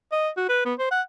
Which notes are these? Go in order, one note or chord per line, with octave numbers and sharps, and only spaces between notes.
D#5
F#4
B4
B3
C5
F#5